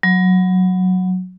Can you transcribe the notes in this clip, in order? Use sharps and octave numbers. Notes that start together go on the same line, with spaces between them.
F#3